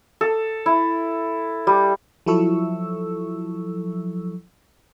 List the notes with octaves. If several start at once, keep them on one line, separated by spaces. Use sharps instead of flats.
A4
E4
G3
F3 F#3 E4 A4 C#6 E6